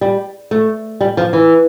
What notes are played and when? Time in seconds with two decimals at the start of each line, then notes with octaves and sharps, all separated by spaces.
0.01 G3
0.51 A3
1.01 G3
1.17 F3
1.33 E3